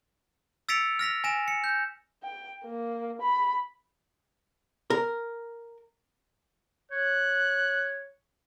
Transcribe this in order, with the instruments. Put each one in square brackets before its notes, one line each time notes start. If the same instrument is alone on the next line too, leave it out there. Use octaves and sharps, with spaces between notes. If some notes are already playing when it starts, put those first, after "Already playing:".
[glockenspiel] E6 A6 B6 C#7 D7 F7
F6 A#6 B6 F7
G#5 A#6 E7
C#7
G6
[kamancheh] G5
A#3
B5
[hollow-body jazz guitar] A#4
[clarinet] C#5 [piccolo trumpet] F#6